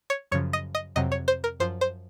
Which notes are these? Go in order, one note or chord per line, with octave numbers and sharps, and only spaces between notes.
C#5
F#2 C#3 F3 C#5
D#5
D#5
F2 C3 F#3 D#5
C#5
C5
A#4
F#2 F3 C5
C5